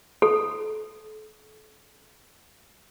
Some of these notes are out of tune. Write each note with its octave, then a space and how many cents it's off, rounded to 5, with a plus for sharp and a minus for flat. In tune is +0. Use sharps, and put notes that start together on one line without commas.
A4 -35